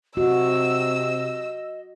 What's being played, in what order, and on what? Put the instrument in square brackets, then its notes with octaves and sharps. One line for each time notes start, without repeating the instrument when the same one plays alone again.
[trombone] C3 [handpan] F#4 [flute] D#5 [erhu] E6